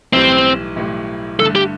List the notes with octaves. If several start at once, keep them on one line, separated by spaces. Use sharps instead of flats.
B1 A2 E3 G3 C4
B1 A2 E3 G3
G2 D3 A3 A4
G4